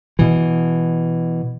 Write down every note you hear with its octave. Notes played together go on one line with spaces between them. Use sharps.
B2 E3